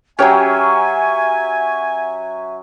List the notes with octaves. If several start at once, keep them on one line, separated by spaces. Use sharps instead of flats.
F#3 C#4 G4 G#4 C#5 E5 G#5